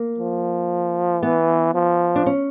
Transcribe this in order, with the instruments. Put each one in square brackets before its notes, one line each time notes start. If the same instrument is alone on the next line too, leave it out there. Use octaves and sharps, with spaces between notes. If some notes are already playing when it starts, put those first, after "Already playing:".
Already playing: [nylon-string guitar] A#3
[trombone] F3
[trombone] E3 [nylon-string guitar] B3
[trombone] F3
[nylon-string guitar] D4
C#4